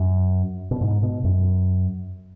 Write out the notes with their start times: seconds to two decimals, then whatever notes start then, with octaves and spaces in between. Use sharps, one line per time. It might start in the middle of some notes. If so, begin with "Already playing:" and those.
Already playing: F#2
0.71 B2
0.81 G#2
1.03 B2
1.24 F#2